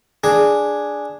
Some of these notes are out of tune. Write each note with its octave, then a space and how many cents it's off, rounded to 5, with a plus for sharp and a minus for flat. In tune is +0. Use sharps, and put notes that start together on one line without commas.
D4 +0 G#4 +0